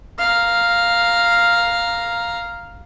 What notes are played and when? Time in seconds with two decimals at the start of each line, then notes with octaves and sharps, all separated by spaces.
0.19 F5 A#5